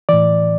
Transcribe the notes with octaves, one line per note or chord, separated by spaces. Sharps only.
A2 E3 D5